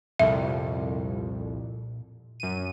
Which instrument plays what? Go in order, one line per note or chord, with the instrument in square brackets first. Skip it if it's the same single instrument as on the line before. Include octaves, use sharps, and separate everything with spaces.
[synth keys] C2 F2 [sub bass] A#2 [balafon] E5
[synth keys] F#2 D#7